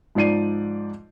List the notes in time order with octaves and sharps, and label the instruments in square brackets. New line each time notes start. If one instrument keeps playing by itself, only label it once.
[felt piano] G#2 F3 D#4 D5 C7 D#7